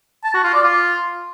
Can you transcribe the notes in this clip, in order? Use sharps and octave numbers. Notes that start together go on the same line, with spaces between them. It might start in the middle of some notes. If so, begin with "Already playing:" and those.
A5
F#4
F4
D5
F4